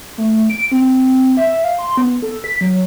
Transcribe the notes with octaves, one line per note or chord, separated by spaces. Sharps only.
A3
D7
C4
E5
F5
C6
B3
A4
B6
F#3